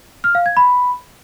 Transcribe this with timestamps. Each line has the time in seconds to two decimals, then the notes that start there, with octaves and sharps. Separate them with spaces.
0.24 F6
0.35 F5
0.46 G#6
0.57 B5